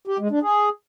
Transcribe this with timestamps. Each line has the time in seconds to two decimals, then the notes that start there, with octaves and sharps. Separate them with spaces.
0.07 G4
0.19 G#3
0.31 D4
0.42 G#4